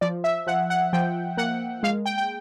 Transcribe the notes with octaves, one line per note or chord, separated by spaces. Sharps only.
F3 D5
E5
F3 F#5
F#5
F3 G5
A#3 F#5
G#3 F5
G5
G5